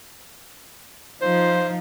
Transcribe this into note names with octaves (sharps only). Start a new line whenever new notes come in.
F3 D#4 F4 C5